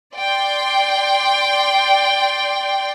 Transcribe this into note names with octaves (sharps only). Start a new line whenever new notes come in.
D5 G5 C6